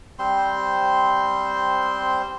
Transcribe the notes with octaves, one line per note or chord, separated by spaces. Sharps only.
G3 C4 C5 C6